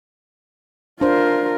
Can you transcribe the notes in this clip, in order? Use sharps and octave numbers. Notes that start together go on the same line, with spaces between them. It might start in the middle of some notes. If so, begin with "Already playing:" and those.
D4 F4 A#4 C5